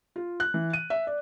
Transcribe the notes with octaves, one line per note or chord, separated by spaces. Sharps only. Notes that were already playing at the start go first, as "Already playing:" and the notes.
F4
F#6
E3
D#7
E5
D5